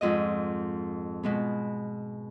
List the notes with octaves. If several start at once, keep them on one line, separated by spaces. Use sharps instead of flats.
F2 G#2 D#5
B2 G#3 B3